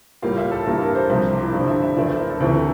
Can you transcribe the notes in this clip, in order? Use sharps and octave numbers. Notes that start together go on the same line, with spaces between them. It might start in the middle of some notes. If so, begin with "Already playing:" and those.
A2 G3 A#3 F4 F5
E5
A4
G2 E3 G3 A#3 A#4
A#4
C5
C2 C3 F3 C5
G4
E4
G2 D3 F3 D5
E5
E5
E2 E3 A3 E4 D5
C5
A#4
A4
D2 C3 E3 A3